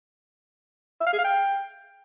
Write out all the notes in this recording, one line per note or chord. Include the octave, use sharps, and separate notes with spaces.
E5
F5
G#4
F5
G5